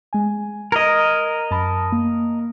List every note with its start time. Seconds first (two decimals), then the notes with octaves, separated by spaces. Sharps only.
0.13 G#3 G#5
0.72 A#4 D#5 G#6
1.51 F#2 A5 B5
1.92 A#3